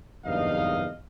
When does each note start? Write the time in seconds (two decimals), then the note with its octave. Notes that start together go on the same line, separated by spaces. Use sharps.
0.25 F#1 E2 G2 D#4 D#5 F5